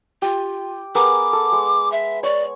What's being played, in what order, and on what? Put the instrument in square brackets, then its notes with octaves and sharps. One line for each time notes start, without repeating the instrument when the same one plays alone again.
[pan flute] F4 [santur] G4
[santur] B3 G#4 A#4 [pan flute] D6
[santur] A4
G#3
[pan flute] E5
[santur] C#5 [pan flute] D5